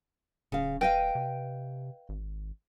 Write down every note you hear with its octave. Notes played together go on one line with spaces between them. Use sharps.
D1 C#3 F5
B4 D#5 F5 G5
C3
G#1